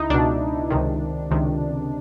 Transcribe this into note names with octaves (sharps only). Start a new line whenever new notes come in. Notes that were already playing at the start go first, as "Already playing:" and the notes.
Already playing: C#2 D#4 E4
C#2 B2 D4
C#2 C3 D#3
C#2 C3 D#3